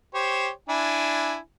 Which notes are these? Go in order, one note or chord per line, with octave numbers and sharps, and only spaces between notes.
G4 C5 C#5
D4 E4 G#5